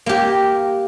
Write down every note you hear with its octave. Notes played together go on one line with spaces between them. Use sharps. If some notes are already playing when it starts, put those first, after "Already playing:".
A#3 G4